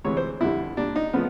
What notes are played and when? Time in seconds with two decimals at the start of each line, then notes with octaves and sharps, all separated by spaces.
0.04 D2 C3 E3 G#3 C#5
0.17 C5
0.40 F2 D3 G3 E4
0.77 A#2 G3 D4
0.96 D#4
1.13 C#3 F3 A3 B3